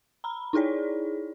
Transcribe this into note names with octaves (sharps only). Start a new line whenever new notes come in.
A#5 B5
D#4 E4 G#4 C#5 D5